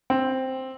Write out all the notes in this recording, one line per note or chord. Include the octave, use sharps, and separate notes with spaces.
C4